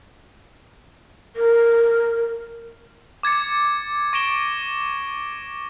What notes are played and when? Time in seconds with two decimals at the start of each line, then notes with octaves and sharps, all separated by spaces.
1.36 A#4
3.23 D6 G#6 A6 C#7
4.13 C#6 A#6 D7 E7 G7